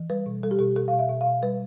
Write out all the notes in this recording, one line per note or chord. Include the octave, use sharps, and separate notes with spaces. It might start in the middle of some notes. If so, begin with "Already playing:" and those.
Already playing: E3
G3 B4
B2
G3 A4
G4
B2 A4
B2 A4
B2 F5
E5
B2
F5
B2
G3 B4